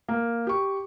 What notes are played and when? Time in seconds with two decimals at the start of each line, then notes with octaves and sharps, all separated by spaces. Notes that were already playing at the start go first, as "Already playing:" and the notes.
0.09 A#3
0.47 G4 C#6